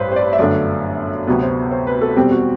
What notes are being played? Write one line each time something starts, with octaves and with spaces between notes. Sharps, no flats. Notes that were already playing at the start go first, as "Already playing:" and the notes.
Already playing: A1 G2 B4 C5
C5
D5
E5
G1 F#2 D3 A3 D4 D5
D2 C3 F#3 B3
C5
C5
B4
A4
E2 B2 G3 C4 G4
F#4